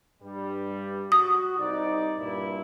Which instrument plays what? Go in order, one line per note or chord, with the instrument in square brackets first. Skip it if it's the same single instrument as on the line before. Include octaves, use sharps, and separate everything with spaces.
[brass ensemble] G2 G3
[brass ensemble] F#4 [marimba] D#6
[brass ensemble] C2 D#4 D5
G2 A#2 E4